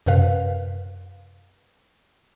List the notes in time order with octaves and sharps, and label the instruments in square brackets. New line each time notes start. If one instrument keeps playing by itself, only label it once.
[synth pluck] F#2 C3 A#4 B4 F5